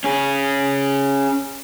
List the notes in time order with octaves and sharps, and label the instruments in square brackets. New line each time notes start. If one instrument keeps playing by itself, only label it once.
[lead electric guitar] C#4 G#4